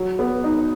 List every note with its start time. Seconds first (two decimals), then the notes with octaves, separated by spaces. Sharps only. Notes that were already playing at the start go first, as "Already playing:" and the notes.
Already playing: F#3
0.19 B3
0.44 D#4